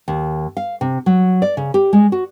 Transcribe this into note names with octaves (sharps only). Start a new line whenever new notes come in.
D#2
F5
C3
F#3
D5
C#3
G4
G#3
F#4